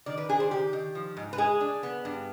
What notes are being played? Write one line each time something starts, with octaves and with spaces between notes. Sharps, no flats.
D#3 D5
B4
D4 G#4
C5
D#3 G4
D#3
F3
G#2
B4
G#3 G#4
D4
B3
G2